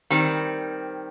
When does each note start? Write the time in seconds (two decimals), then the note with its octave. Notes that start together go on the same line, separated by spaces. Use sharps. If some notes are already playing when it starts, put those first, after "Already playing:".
0.10 D#3 G3 C4